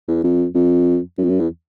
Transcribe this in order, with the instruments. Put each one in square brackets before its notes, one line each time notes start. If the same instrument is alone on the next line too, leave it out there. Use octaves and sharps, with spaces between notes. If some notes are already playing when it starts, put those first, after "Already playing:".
[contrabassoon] E2
F2
F2
F#2
F2
F#2
E2